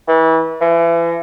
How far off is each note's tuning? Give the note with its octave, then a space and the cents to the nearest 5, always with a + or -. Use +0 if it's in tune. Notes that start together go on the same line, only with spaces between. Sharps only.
E3 -30
E3 +35